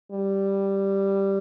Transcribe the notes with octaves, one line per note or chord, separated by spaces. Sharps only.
G3